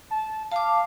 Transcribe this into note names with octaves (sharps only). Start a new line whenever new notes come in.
A5
F5 A5 D6